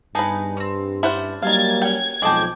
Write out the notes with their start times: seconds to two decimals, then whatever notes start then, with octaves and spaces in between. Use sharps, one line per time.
0.15 G2 B3 D#4 G#4 B4 A5
0.57 C4 C#4
1.03 C#4 D4 E4 C5 F#5 F#6
1.42 F#3 G3 A#3 D#4 F5 G#6 A6
1.82 C#4 F#5 G5 G#6
2.22 B1 F2 G#3 D5 D#5 G5 A5